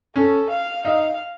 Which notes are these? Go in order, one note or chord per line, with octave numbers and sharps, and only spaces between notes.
C#4 A4
F5
D#4 F5